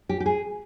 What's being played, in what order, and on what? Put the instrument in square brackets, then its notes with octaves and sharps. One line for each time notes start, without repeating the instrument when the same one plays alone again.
[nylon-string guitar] G4
G4
G#4